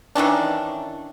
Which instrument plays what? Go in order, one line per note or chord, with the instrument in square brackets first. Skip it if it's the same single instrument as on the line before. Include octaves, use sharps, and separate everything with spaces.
[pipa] D#3 E3 C#4 D4